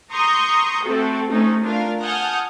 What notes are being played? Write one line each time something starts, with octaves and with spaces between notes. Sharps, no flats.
A#5 C6 C#6 D#6 G6
A3 C4 F#4 A4
C3 A3 C#4 D#4
A3 D4 F4 A#4 F5
F#5 G#5 A5 D#6 F6 G6